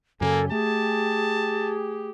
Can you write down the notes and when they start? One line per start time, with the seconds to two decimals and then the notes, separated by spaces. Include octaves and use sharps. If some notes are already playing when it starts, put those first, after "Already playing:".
0.21 F#2 C#3 A#3 A4 G#5
0.51 A3 G4 G#4 A5